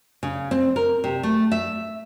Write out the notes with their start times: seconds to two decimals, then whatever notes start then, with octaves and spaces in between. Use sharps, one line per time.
0.23 C#3
0.51 C4
0.76 A#4
1.04 C3
1.23 A3
1.52 E5